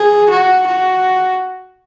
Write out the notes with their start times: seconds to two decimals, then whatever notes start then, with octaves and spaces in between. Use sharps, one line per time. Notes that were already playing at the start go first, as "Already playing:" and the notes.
Already playing: G#4
0.30 F#4
0.67 F#4